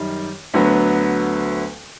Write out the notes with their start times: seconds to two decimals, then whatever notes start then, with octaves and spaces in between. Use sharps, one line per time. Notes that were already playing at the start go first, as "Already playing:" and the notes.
Already playing: F#2 D#3 G3
0.54 D2 D3 F#3 B3